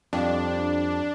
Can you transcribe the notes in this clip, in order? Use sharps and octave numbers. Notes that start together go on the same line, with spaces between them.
F2 G3 D4